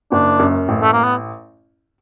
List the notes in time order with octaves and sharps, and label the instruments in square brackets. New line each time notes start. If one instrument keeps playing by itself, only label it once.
[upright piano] F#1 [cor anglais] D4
[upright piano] F#2
A1
[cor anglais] A3
A#3
B3